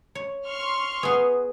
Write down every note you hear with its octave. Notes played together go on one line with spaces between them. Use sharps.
C#5
C6 C#6 F6
B3 G#4 B4